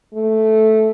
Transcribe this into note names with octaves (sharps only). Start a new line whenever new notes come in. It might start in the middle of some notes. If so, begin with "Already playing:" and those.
A3